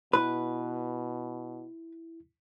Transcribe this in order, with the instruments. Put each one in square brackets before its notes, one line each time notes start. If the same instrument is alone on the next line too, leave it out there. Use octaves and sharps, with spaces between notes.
[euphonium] B2 [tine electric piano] E4 [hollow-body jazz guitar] B4